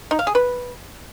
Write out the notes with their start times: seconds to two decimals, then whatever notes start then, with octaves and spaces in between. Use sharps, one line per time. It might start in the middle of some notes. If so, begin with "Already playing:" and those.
0.11 D#4
0.19 F5
0.27 G#4
0.35 B4